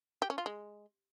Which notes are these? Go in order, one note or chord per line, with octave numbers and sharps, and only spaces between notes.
G4
C#4
F4
G#3